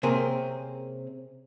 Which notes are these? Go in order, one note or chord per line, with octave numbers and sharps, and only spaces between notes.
C3 A#3 C4 C#4 G#4 A#4